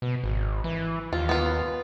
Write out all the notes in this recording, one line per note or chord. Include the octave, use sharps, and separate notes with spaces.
B2
G#1
E3
D#2 F4
B3 F4